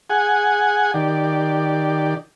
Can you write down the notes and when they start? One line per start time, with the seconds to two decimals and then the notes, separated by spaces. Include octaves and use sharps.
0.10 G#4 F#5 G#5
0.94 D#3 G4 D5